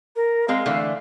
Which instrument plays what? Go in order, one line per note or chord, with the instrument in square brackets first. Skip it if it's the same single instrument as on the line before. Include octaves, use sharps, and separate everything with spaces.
[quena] A#4
[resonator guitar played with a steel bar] G#3 C4 G#4 [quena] F5
[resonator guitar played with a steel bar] D3 E3 A3